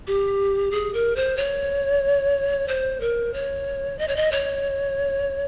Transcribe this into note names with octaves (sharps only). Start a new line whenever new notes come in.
G4
G#4
A#4
C5
C#5
C5
A#4
C#5
D#5
C#5
D#5
C#5